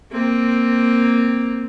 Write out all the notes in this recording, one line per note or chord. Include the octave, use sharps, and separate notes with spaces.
A#3 C4